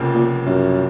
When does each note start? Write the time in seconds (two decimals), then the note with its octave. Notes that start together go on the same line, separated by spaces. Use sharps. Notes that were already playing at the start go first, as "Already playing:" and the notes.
Already playing: F1 F2 C#3 F3 A#3
0.14 A#2
0.46 F#2